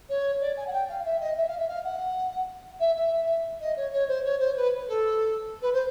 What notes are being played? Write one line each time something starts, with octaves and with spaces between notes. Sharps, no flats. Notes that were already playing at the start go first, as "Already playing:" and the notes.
C#5
D5
G#5
F#5
G5
F5
E5
D#5
E5
F5
E5
F5
F#5
E5
E5
D#5
C#5
C#5
C5
C#5
C5
B4
A4
B4
C5